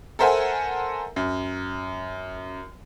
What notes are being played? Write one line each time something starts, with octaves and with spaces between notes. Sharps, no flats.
A4 A#4 C5 E5 F#5 G#5
F#2